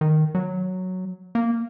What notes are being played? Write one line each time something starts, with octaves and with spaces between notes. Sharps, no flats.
D#3
F#3
A#3